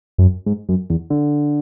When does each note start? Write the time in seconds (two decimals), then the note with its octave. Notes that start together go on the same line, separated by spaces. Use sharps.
0.18 F#2
0.46 G#2
0.69 F#2
0.90 E2
1.10 D3